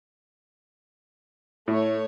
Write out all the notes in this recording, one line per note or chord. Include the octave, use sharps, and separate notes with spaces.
A2 A3 C#5